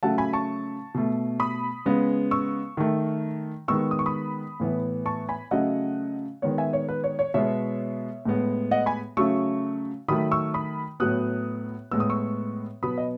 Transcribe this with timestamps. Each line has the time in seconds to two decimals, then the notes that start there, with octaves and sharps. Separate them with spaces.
0.03 C#3 F#3 A3 F#5 A5
0.18 G#5 B5
0.33 A5 C#6
0.95 B2 A3
1.40 B5 D#6
1.86 C#3 G#3 B3
2.31 C#6 E6
2.77 D#3 A3
3.68 D#3 G#3 B3 C#6 E6
3.91 D#6
3.99 C#6
4.06 B5 D#6
4.60 A2 E3 B3
5.06 A5 C#6
5.29 G#5 B5
5.51 C#3 F#3 A3 D#5 F#5
6.42 D#3 G#3 B3 C#5
6.58 E5 G#5
6.73 C#5
6.89 B4
7.04 C#5
7.19 C#5
7.34 B2 G#3 B3 C#5 E5
8.25 A2 G#3 B3
8.71 D#5 F#5
8.86 G#5 B5
9.17 C#3 F#3 A3 C#6 E6
10.08 D#3 F#3 A3 B5 D#6
10.31 C#6 E6
10.54 B5 D#6
11.00 A2 F#3 B3 D#6 F#6
11.91 A2 G#3 B3 E6
12.00 D#6
12.10 C#6 E6
12.83 B2 F#3 B3 B5 D#6
12.98 D#5